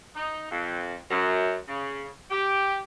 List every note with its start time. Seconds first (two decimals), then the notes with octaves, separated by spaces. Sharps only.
0.16 D#4
0.51 F2
1.10 F#2
1.68 C#3
2.31 G4